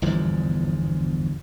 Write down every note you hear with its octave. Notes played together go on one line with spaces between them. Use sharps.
G1 E2 G#2 F3